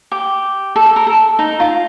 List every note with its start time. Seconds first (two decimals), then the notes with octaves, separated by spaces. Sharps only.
0.12 G4
0.76 A4
0.86 A4
0.96 A#4
1.07 A4
1.39 D#4
1.60 F4